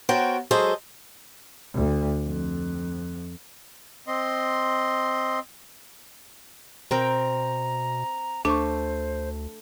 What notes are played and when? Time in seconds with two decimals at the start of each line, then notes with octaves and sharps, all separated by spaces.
0.09 B3 F#4 A#4 C5 C#5 G5
0.51 F#3 G#3 G#4 A4 C5 D#5
1.74 D2
2.26 F2
4.07 C4 D#5 C6
6.91 B2 C4 A#4 G5 A#5
8.45 D2 A3 D4 C5 C#6